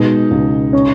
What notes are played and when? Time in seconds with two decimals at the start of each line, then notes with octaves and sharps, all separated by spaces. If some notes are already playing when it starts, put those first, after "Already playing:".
Already playing: B2 G#3 D#4
0.31 C#2
0.73 C#4